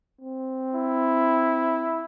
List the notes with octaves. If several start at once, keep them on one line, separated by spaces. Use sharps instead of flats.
C4
E4